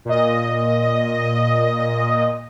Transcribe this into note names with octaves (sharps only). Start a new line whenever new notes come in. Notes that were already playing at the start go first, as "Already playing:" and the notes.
A#2 D#5